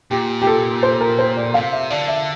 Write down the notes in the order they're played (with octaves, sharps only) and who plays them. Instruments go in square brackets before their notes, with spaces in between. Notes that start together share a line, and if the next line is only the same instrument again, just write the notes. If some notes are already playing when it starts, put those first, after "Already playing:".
[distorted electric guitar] A#2 [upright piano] G4
[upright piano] G4
A4
C5
A#4
C5
D5
[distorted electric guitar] C3 [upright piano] F5
[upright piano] E5
[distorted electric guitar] D3 [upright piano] D5
[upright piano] E5